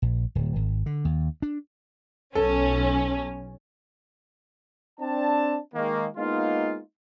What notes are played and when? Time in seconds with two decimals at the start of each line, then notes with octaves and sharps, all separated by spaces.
0.02 A#1
0.35 D1
0.56 G#1
0.86 D3
1.05 D#2
1.42 D4
2.35 B1 C#4 A4
5.00 C4 D4 A5
5.74 D#3 G#3 A#3
6.16 G#3 A#3 B3 D#4 F4